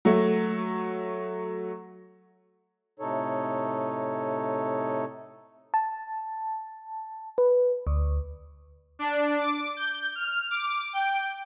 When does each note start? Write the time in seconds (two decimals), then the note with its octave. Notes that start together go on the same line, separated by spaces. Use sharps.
0.05 F#3 A3
3.00 A2 C3 D#4 A4 C#5
5.74 A5
7.38 B4
7.87 D2
8.99 D4
9.39 D6
9.77 G6
10.15 F6
10.51 D6
10.93 G5